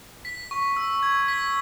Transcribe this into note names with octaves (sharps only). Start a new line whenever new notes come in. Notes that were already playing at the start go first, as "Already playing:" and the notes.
B6
C#6
E6
G#6
B6